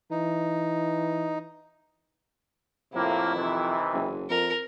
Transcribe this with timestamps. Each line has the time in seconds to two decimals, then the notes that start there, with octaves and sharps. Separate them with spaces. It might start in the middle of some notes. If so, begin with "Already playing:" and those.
0.11 E3 D#4
2.94 F2 A2 C3 A#3 E4
3.35 C3 D#3 E3
3.93 F#1
4.30 F2 A#4